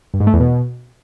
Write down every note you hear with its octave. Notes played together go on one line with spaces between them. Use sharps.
G2
G#2
A3
E2
B2